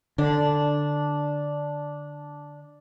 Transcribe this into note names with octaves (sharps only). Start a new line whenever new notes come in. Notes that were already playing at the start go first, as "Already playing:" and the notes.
D3 D4